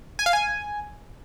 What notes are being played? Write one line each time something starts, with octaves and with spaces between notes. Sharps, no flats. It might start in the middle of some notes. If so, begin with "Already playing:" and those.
G#5
F5
G#5